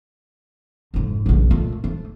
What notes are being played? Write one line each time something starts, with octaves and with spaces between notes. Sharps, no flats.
F2 G#2
A#1 F#2
A#2 A3
A3